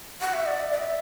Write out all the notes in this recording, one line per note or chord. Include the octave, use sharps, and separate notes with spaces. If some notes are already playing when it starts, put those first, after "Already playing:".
F#5
E5
D5
E5
D5
E5